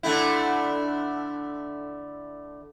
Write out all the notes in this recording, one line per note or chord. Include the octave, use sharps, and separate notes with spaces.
D3 A3 E4